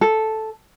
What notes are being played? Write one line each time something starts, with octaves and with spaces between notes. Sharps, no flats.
A4